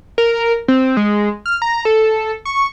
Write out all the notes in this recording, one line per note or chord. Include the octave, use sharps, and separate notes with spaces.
A#4
C4
G#3
F6
A#5
A4
C#6